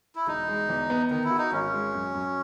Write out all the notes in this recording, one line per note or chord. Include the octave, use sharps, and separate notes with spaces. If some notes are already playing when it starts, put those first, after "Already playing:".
E4
E1 D#4
G#3
E2
B3
D#3 D#4
E4
F#4
D#4
G#1 C#4
G#3
F#2
F#2